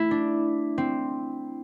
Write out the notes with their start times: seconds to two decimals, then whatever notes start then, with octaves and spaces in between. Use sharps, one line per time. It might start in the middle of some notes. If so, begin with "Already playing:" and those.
Already playing: A3 E4
0.11 D4
0.78 C4